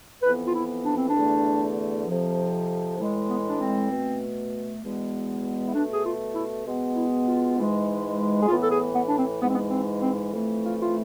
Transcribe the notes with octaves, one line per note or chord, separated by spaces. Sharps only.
F2 E3 B3 B4
F4
E4
D4
C4
D4
E2 D3 A3
F2 C3 F3
A2 E3 G#3
B3
D4
C4
B2 A3
E2 B2 G#3 B3
E4
B2 A3 D4
G#4
F4
E4
B2 G#3 B3
E4
F4
G#2 E3 G#3
G#4
A2 E3 B3 F4
A4
G#4
B3
D4
C4
G#2 E3 G#3 B3
C4
B3
C4
C4
F2 E3 A3
F4
F4